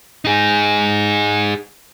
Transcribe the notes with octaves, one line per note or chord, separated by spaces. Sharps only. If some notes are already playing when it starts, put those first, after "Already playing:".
D#4 G#4